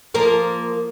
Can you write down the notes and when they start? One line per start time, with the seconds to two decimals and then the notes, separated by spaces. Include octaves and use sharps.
0.14 F3 A#3 A#4